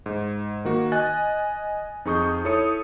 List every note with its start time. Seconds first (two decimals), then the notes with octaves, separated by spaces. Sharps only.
0.06 G#2
0.65 D#3 A#3 F#4
0.92 D#5 G#5 F#6 A6
2.05 F2 D#4 G#4 C#6 D#6 G6
2.45 E4 A4 C#5 D#6 C#7